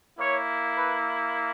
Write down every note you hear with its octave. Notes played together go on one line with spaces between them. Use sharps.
A#3 E4 C#5
B4